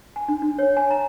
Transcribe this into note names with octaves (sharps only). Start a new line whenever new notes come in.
G#5
D4
D4
C#5
G#5
A#5